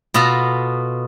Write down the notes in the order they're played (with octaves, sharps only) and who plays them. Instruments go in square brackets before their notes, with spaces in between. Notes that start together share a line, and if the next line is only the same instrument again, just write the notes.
[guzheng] B2 B3 F4 A4 A#5